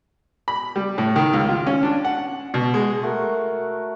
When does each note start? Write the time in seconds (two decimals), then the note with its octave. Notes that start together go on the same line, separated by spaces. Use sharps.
0.48 B5
0.76 G3
0.98 A2
1.16 D#3
1.33 C#2
1.49 F4
1.67 C#4
1.83 D4
2.05 F#5
2.54 B2
2.74 G#3
3.03 A3 F#4 A#4